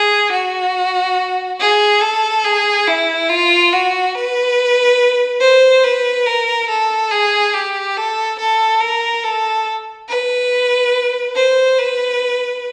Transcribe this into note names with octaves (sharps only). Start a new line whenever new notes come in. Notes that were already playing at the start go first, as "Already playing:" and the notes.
Already playing: G#4
F#4
G#4
A4
G#4
E4
F4
F#4
B4
C5
B4
A#4
A4
G#4
G4
A4
A4
A#4
A4
B4
C5
B4